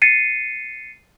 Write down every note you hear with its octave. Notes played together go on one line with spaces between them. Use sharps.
A6 C7 C#7 D#7